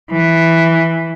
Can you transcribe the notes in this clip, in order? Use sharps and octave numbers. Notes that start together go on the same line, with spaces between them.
E3